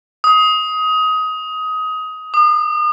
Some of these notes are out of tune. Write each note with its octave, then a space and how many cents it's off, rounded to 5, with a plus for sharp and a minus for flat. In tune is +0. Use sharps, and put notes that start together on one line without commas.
D#6 +20
D#6 -40